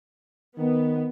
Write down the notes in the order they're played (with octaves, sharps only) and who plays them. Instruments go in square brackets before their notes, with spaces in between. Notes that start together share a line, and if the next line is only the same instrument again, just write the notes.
[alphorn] D#3 [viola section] B3